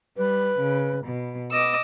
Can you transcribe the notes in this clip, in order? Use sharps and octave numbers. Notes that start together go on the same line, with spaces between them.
G3 B4
C#3
B2
B3 D#5 D6 E6